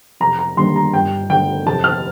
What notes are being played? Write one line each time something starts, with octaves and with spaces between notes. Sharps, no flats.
F1 A#5
A#5
D#2 D3 G3 D4 C6
A#5
G2 G5
D3 A3 G5
F1 A5
F6